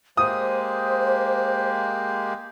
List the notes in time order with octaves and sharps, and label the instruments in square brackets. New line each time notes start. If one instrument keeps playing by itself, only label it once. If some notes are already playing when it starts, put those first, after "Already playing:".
[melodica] G#3 A#3 G4 [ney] C5 [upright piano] D#6